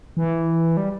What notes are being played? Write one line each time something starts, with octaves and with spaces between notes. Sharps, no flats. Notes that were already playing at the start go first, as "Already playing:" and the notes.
E3
G3